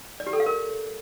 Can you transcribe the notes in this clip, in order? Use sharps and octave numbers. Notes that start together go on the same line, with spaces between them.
D5
G4
A4
F5
A#4